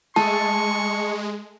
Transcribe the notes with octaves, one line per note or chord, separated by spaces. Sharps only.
G#3 A3 G#4 A4 A5 C#6